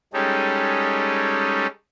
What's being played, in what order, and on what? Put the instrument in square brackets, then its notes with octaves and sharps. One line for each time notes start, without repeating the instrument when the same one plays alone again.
[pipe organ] G3 G#3 C#4 D#4 G4 A4